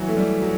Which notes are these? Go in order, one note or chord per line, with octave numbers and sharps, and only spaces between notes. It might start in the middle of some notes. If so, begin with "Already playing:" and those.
Already playing: E3 F#3
A3
G3
F#3